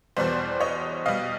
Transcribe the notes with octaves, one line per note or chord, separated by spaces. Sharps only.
E2 B2 G3 C5 D5
C#5 D#5
B2 G3 D#5 F5